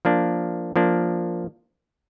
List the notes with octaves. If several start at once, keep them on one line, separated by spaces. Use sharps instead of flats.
F3 A#3 D4
F3 A#3 D4